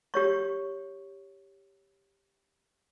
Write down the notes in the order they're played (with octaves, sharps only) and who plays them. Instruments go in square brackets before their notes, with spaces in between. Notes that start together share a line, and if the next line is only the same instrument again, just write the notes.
[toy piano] G4 C#5 C#6